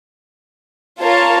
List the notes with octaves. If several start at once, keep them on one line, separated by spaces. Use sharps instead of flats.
F4 A#4 C#5 F5 A5